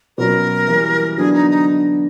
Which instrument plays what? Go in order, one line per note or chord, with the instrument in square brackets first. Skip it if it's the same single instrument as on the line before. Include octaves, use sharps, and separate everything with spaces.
[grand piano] B2 F#3 A#3 C#4 [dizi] A#4
[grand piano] E3 G3 A#3
[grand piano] D3 F#3 B3 D4 [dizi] G#4
[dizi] D#4
D#4